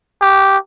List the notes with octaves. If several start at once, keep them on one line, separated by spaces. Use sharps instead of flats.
G4